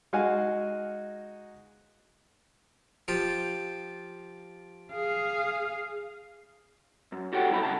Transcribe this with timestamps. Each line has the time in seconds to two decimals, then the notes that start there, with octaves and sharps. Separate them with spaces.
0.13 G#3 D#4 F#4 F5 F#5 G#5
3.08 F3 F4 G4
4.93 G#4 F5
7.12 F#2
7.33 F#4 G4 A4 C#5 F#5 G5
7.50 G2 B2 F#3 E4 A4 B5
7.63 C2 C#3 A5